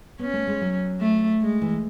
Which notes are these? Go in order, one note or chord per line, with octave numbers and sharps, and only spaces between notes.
B3 C#4
A3
G#3
F#3
A3
G#3
E3